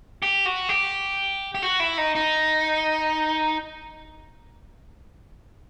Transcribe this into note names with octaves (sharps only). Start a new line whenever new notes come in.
G4
F#4
G4
G4
F#4
E4
D#4
D#4